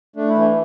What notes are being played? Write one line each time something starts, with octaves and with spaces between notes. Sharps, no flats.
A3 D4
E4
E3
D4